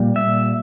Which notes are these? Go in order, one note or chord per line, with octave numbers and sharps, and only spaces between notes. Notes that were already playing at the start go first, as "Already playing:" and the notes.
Already playing: A#2 G3
E5